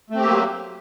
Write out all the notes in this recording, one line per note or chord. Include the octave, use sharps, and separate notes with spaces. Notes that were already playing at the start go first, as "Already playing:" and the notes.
F#3 A3 A#3 C4 G4